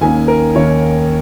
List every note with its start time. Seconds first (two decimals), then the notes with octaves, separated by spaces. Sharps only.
0.01 D#2 D#3 A#3 C#4 G#5
0.28 A#4
0.55 D#2 D#3 A#3 C#4 C#5